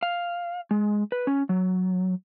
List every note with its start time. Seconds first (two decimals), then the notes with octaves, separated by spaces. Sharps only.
0.03 F5
0.71 G#3
1.12 B4
1.27 C#4
1.49 F#3